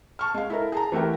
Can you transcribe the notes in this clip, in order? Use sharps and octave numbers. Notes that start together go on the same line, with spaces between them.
A5 C#6 F6
G#3 F5
E4 A4 A#4
G#4 A5 A#5
E3 A3 F#4 G4 A#4